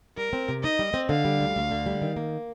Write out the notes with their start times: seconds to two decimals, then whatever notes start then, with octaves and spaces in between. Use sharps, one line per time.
0.18 G3 A#4
0.33 C4
0.49 C3
0.64 D#4 D#5
0.79 G3
0.94 C4
1.09 D3 F5
1.25 G3
1.40 D2
1.56 D2
1.71 D3
1.86 G3
2.02 D#3
2.16 A#3